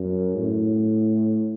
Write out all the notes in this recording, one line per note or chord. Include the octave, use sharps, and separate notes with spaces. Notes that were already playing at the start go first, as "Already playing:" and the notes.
Already playing: F#2
A2